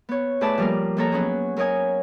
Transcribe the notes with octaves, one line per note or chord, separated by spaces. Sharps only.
B3 C#5
A2 G#4 B4 D5 A5 E6
F3 G3 A#3 A#4
F2 A#3 A4 C#5 A#5
F#3 B3 C#4 G#4
F#3 A#4 C#5 D#5 G#5